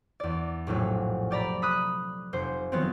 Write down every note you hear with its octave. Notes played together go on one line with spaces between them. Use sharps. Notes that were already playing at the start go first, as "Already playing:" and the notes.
E2 D5
F1 A#1 A2 F#3
G4 D5 A#5 B5
B5 D#6 F#6
F1 C5
D#3 F3 F#3 B3 C4